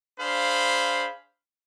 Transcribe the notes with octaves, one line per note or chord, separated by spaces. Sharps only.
D4 G#4 C5 F5 B5